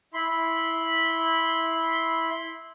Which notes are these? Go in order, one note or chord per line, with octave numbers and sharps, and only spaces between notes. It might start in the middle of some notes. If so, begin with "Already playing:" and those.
E4 B5 C6